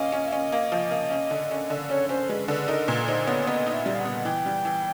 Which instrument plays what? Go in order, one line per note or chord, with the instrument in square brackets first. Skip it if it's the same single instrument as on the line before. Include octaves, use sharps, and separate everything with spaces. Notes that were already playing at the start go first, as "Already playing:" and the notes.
Already playing: [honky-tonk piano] A#3 C#4 F4 [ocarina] D#5
[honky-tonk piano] C#4
[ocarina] E5
[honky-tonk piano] C#4 [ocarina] D#5
[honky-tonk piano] A#3
F3
A#3
C#4
D3
C#4
D3
[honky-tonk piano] C#4 [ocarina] C#5
[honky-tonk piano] C#4 [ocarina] C5
[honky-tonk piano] G#3 [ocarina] B4
[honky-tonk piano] D3 [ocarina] B4
[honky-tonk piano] D#4 [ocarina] A#4
[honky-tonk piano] A#2 [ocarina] B4
[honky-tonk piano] D#4 [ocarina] C5
[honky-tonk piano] B3 [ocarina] C#5
[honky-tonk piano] B3 [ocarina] D#5
[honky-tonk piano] D#4
[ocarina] E5
[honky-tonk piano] G3
[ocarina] F5
F#5
[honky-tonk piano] B3
[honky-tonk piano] E3 [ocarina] G5
[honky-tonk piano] G3
E3